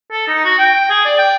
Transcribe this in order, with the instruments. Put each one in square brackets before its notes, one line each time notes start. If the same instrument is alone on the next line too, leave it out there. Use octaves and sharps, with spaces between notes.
[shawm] A4
D#4
F#4
G5
G#4
D5
G5